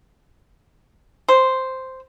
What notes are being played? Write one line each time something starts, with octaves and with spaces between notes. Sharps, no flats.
C5